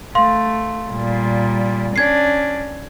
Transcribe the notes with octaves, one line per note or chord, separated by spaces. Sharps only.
A3 F5 C6
A#2 G3
C#4 D4 G#6 C7